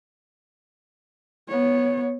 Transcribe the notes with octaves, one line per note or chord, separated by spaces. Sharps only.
B3 C#5